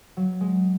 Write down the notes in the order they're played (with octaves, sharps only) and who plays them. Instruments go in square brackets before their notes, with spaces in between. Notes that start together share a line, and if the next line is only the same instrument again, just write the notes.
[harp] F#3
G#3